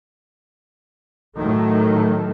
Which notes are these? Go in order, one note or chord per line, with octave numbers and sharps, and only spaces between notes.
A2 D#3 F#3 A3